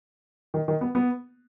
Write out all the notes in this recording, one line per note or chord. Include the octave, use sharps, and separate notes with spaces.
D#3
D#3
B3
B3